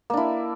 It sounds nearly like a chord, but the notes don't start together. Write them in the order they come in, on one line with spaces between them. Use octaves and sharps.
A#3 D4 E4